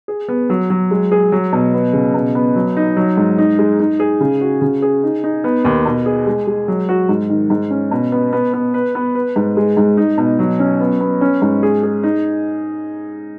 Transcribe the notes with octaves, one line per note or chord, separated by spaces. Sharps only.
G#4
B3
F#3
F#3
G#3
G#4
F#3
B2
B3
C#3
B2
B3
F#3
D#4
F#3
G#2
D#4
G#3
D#4
G#4
C#3
F#4
C#3
G#4
D#4
D#4
B3
D#2
B2
G#4
G#3
G#3
F#3
F#4
G#2
D#3
G#2
C#4
B2
B3
B3
B3
B4
B3
B4
G#2
G#3
G#2
D#4
B2
F#3
C#4
B3
B3
C#4
G#2
G#4
G#4
D#4